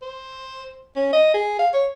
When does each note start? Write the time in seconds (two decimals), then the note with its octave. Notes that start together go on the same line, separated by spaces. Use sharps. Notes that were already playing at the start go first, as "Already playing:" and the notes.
0.02 C5
0.96 C#4
1.13 D#5
1.34 G#4
1.59 F5
1.74 C#5